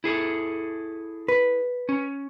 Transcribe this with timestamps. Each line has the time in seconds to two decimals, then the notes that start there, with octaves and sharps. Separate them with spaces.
0.04 E4 G#4 A4
1.28 B4
1.89 C#4